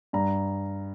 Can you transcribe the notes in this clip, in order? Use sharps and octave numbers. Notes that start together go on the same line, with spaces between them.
G2 A#5